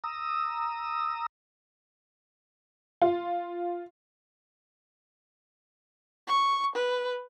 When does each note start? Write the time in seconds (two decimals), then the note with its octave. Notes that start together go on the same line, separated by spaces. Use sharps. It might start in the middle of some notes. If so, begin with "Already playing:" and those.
0.04 A#5 D#6 E6
3.02 F4
6.27 C#6
6.75 B4